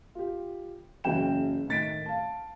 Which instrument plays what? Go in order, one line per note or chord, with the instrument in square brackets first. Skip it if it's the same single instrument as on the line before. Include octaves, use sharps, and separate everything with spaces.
[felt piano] F4 G4
F#1 C#3 E3 F#3 G5 E7
A2 D#3 A6 B6 D7
F5 A5